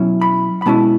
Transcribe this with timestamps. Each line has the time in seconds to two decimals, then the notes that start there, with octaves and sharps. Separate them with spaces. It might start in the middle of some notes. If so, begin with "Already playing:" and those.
Already playing: B2 F#3 C#4 E4
0.21 B5
0.62 B5
0.66 B2 G#3 C#4 E4 A5